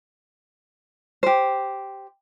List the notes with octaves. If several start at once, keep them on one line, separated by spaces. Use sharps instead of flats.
G4 C5